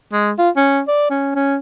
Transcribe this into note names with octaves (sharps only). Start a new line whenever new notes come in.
G#3
F4
C#4
D5
C#4
C#4